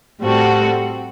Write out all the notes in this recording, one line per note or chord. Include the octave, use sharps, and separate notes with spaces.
A2 G3 C4 F#4 A4